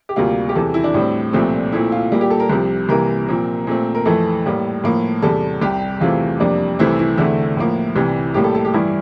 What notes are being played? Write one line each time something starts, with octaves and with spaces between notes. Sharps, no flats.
G4
D2 C3 G3 A#3 F4
G4
E2 C3 E3 A4
E4
D4
A2 G3 C4
C2 A#2 F3 A3 C4
A#2 A3 C4 E4
F4
A#2 G3 A#3
G4
A4
A#4
C2 C3 F3
C2 C3 E3 A#3 A#4
A#2 F3 C4
A#2 A3 C4
A#4
F2 E3 A3 A4
A2 G3 A#3
A2 F3 A#3
E2 C3 G3 A4
C2 C3 G3 G4
E2 C3 E3 A3 C4 F4
F2 C3 G3 A#3 D4
C2 C3 E3 A3 C4 E4
E4
E2 D3 A3 C4 E4
A2 F3 A#3
C2 C3 E3 G3
A2 G3 A#3 G4
A4
A4
G4
G2 E3 G3 E4